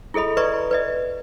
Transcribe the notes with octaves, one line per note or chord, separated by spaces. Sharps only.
E4 G#4 A4 D#5 B5
B4 D5 D#5 A#5 C6 C#6
B4 D5 D#5